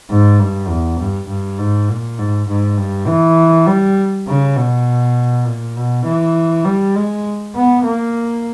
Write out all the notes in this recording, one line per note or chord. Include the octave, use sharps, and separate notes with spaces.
G#2
G2
E2
G2
G2
G#2
A#2
G#2
G#2
G2
E3
G3
C#3
B2
A#2
B2
E3
G3
G#3
B3
A#3